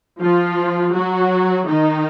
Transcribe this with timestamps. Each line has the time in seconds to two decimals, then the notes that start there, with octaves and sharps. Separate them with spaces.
0.22 F3 F4
0.96 F#3 F#4
1.69 D#3 D#4